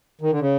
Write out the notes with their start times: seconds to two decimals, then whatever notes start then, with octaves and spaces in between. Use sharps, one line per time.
0.21 D#3
0.30 D3
0.40 C#3